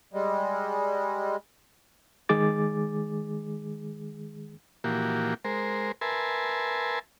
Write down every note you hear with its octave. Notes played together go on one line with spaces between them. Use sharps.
G3 G#3
D#3 G#3 G#4 D6 A6
A#2 E3 F3 A#3 F#4 G4
G#3 A#4 C5
A#4 B4 E5 G#5 A5 C6